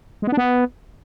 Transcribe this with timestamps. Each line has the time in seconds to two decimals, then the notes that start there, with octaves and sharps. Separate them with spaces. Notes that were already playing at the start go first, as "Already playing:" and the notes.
0.22 G#3
0.27 B3
0.32 D4
0.37 B3